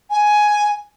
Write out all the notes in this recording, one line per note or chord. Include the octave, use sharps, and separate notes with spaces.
G#5